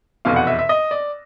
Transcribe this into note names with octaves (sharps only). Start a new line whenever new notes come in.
F1 E2 B2 F5
F#5
E5
E5
D#5
D5